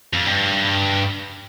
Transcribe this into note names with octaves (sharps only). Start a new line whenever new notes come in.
F2
G2